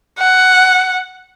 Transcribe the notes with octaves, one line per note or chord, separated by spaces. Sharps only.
F#5